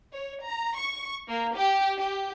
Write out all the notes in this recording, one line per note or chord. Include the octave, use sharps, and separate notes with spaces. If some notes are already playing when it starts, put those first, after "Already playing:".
C#5
A#5
C#6
A#3
G4
G4